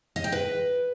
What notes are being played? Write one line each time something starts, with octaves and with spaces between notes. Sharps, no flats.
D#5
G5
B4